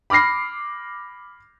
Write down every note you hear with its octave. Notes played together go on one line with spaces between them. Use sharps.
B5 D6 F6 A#6 C7